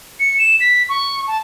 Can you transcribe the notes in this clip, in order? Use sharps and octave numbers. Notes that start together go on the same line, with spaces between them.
C#7
E7
B6
C#6
A5